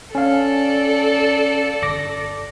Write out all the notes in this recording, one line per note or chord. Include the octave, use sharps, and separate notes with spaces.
C#4 A4 D5 F5
G1 D6 A#6